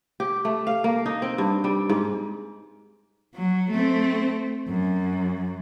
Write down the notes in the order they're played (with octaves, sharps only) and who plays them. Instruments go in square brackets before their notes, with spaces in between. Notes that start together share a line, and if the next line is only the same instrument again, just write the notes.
[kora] G4
A3
F5
A#3
D#4
C4
G2
G3
G#2
[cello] F#3
A3 C4
F#2